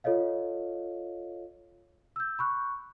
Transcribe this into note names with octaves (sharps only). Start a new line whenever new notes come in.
F4 A4 C#5 D#5 F5
E6 G6
B5 C#6 F#6